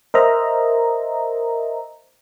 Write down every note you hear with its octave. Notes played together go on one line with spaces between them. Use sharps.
A#4 C5 D#5 E5 A#5